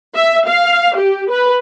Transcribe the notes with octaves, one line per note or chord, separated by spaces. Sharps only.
E5
F5
G4
B4